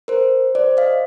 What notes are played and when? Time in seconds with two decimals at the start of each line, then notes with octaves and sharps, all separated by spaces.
0.08 A#4 C5
0.55 C5 D5
0.77 D#5 F5